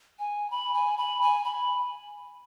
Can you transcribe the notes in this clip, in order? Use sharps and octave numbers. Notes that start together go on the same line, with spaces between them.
G#5
B5
G#5
B5
G#5
B5